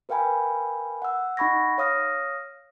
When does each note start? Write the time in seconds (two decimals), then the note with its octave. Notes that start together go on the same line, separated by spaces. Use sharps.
0.09 A#4 B4 F5 G5 G#5 B5
1.02 F#5 E6
1.37 D#4 F#5 B5 C#6 G#6 A#6
1.78 C#5 F5 D#6 F6 A#6